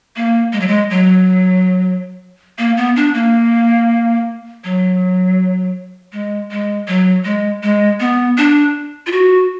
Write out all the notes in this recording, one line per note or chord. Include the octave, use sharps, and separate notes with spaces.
A#3
G#3
F#3
G#3
F#3
A#3
B3
D4
A#3
F#3
G#3
G#3
F#3
G#3
G#3
B3
D4
F4
F#4